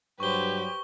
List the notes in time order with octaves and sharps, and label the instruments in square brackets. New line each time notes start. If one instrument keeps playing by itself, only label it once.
[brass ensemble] G2 F#3 [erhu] G4 [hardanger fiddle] B4 C5 [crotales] C#6 G7